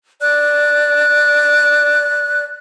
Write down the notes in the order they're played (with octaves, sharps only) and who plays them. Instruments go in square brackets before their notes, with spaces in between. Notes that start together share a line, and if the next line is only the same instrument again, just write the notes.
[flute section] D5 F#6